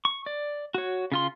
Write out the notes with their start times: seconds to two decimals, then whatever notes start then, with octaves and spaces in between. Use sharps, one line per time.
0.05 C#6
0.26 D5
0.74 F#4 C#5
1.12 C#3 F4 C6